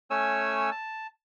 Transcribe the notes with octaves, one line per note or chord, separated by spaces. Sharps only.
A3 C#4 C#5 G#5 E6
A5